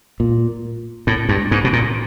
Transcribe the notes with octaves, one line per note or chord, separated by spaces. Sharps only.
A#2
A2
G2
G#2
B2
A#2